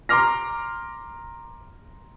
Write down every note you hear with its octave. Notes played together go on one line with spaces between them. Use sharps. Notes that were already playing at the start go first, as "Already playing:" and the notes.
A#5 C6 D6 F6 A#6